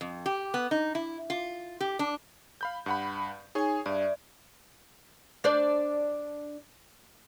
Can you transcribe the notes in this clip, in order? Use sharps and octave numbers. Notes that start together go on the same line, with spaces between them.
F2
G4
B3
D#4
E4
F4
G4
D4
F5 B5 G6
G2 F#5 B5
D#4 G#4 C#5 G#5 G#6
G2 D5 E5
D4 C5 D5